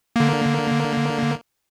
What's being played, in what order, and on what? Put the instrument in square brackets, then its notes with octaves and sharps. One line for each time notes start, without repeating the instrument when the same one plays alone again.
[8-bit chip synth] D3 A#3